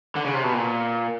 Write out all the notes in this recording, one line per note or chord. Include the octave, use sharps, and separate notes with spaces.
D3
C#3
C3
B2
A#2